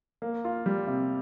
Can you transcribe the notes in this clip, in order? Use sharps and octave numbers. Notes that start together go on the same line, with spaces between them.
A#3
F4
G3
C3